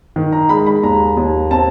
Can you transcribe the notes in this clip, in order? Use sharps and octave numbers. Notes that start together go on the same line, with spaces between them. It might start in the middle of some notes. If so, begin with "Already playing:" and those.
D#3
A#5
G#3 B5
B5
D#2 A#5
D#2
C4 A5